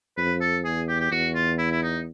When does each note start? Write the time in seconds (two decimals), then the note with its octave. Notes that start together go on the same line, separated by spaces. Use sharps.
0.17 F2 B4
0.41 A4
0.64 E2 G#4
0.88 G4
1.00 G4
1.12 E2 F#4
1.35 F4
1.58 E4
1.71 E4
1.82 D#4